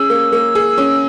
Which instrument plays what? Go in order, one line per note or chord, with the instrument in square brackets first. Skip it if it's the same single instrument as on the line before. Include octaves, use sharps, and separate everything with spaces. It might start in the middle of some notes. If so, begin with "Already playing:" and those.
Already playing: [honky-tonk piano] C#4 G#4 [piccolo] E6
[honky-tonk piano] A#3
A#3
G#4
C#4